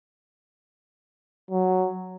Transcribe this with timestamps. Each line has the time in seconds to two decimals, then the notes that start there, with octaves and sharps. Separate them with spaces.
1.51 F#3